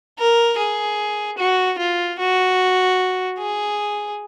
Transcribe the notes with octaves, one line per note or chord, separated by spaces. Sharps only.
A#4
G#4
F#4
F4
F#4
G#4